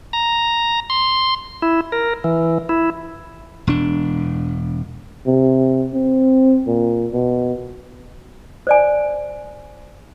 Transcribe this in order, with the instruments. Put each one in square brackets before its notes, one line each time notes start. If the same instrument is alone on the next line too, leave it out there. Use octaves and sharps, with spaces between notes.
[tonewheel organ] A#5
C6
E4
A#4
E3
E4
[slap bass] E1 D4
[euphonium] C3
C4
A#2
B2
[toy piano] C5 D5 G#5